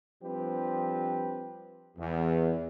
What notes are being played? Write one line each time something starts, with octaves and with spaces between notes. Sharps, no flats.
F3 G3 C4 D4 G4 B4
E2